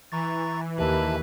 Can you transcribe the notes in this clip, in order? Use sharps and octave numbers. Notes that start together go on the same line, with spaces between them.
E3 A#5 C#6 A6
D#2 G4 B4 E5 A5